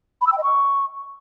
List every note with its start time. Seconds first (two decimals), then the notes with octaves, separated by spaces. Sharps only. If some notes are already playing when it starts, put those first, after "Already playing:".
0.21 B5
0.27 E6
0.32 G5
0.38 D#5
0.43 C#6